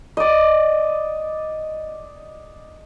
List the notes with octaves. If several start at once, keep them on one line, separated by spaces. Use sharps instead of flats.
D5 D#5